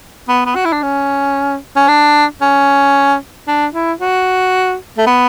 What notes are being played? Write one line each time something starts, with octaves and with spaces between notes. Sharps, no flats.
B3
B3
F#4
E4
D4
C#4
C#4
D4
C#4
D4
E4
F#4
A3
B3